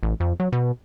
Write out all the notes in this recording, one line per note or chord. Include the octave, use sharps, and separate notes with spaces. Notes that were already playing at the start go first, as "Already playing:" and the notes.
A1
F2
F#3
B2